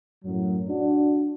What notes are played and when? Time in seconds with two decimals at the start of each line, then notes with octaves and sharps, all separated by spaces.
0.25 F#2 A2 F#3
0.69 D4 F#4